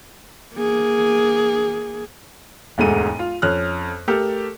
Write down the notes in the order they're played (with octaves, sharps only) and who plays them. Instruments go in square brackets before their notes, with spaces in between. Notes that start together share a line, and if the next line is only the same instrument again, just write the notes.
[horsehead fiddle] A#3 G#4
[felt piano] E1 D2 G#2 A4 D#7
F4
F2 C#4 F6 F#6
A3 G4 A4 A#4